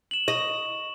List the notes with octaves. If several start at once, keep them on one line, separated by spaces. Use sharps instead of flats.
E7 F#7
D#5 C#6